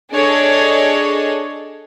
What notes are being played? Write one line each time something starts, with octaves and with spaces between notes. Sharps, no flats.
D4 G#4 A4 C#5 D#5